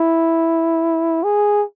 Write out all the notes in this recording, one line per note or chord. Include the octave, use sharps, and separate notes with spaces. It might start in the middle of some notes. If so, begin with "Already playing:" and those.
Already playing: E4
G#4